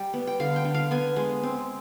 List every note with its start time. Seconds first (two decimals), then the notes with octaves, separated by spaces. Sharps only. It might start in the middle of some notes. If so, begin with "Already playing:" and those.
Already playing: G3 G5
0.14 B3
0.27 G5
0.40 D3 F5
0.56 G5
0.65 D3
0.74 F5
0.91 B3 G#5
1.16 G#3
1.43 C4